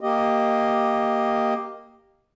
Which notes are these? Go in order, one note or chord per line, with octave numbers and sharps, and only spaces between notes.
A#3 G4 D#5